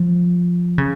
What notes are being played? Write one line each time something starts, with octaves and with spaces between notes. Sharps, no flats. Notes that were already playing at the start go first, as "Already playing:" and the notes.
Already playing: F3
C#3